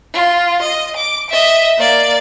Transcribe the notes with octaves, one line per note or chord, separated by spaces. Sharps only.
F4
D#5
D6
D#5 E5
A#3 D5